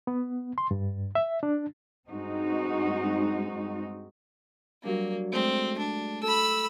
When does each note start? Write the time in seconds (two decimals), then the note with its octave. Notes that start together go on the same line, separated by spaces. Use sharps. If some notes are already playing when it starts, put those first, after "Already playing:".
0.07 B3
0.58 C6
0.71 G2
1.15 E5
1.43 D4
2.08 G2 G#3 C4 D#4 F#4
4.83 F#3 G3 A#3 D4
5.32 G#3 A3 C4
5.78 D4
6.23 A4 B5 E6